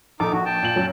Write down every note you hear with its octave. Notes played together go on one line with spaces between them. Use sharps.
A#1 D#4 A4 D6
A#1 F#4
G5 A5
A#2 F#7
F#2 F#3